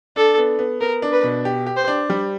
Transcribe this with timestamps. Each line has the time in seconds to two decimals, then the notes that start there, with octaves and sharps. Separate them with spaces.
0.16 D4 A4
0.38 B3
0.59 B3
0.81 B3 A#4
1.02 D4
1.13 B4
1.23 B2
1.45 G4
1.67 G4
1.76 C5
1.88 D4
2.10 G3